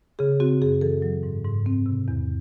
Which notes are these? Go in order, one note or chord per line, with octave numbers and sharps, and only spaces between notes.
C#3 G#4
C4 F#4
F#2 G#4
E3 A4
F#3
G#2
G#2
C4
C3
E2